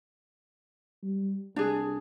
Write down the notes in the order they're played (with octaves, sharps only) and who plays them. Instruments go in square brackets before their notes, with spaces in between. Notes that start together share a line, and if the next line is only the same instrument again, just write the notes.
[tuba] G3
[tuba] C2 [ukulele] D4 G#4